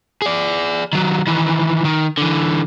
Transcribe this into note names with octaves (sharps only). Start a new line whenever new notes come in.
G#4 D5
D#3 F#3
D#3 E3
D#3
D3 E3